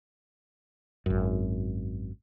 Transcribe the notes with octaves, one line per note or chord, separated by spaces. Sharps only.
G#1 F#2